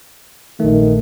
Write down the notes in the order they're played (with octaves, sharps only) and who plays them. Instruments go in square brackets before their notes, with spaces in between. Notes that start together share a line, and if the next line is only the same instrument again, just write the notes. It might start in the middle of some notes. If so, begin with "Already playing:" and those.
[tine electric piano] A#1 A3 [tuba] D#3